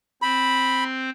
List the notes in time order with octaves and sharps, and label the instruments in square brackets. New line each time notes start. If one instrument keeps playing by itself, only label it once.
[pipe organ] C4 C5 [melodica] B5